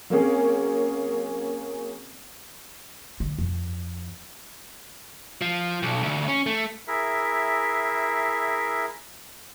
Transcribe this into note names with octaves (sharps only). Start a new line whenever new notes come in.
F#3 A#3 C4 C#4 G#4
D3
F2
F3
B1
D2
C#4
A3
E4 G#4 A#4 E5